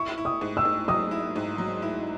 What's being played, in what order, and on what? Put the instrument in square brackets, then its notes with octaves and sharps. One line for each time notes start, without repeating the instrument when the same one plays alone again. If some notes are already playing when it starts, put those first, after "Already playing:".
Already playing: [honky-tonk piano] E4 [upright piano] C#6
[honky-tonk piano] E4
[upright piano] D#6
[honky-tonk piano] G#2
[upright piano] E6
[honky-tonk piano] G#2
[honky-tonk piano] F#3 [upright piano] D#6
[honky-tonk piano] E4
G#2
F#3
E4